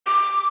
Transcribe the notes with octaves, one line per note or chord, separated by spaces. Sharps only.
D6